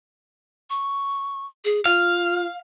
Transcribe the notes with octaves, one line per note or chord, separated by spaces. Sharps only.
C#6
G#4
F4 F5